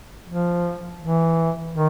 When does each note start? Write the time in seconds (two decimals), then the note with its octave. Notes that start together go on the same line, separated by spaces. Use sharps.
0.27 F3
1.01 E3
1.73 D#3